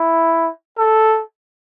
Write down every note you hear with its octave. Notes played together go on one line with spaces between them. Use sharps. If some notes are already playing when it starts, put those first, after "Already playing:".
Already playing: E4
A4